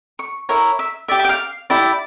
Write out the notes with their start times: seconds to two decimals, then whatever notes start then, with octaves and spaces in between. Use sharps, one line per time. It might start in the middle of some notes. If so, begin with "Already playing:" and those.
0.19 C#6
0.49 E4 A#4 C#5
0.79 E5
1.08 G4 D5 E5
1.19 E5
1.25 G5
1.29 F5
1.70 E4 G4 D5